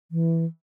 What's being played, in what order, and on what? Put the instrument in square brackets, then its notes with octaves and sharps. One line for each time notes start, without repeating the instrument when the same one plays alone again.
[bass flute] E3